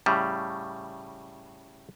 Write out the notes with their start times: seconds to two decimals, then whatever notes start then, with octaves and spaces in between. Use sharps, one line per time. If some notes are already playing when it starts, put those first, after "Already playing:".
0.06 A2 C#3 G3